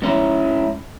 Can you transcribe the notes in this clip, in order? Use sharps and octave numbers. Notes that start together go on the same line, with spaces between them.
G#2 C#4 E4